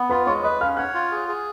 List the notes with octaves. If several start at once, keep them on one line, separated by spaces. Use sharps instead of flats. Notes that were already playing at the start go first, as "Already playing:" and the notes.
Already playing: B3
F4 B4 B5
G#3 C#5 C#6
B4 D#5 D#6
C#4 F5 F6
C#5 F#5 F#6
F4
G#4
G#4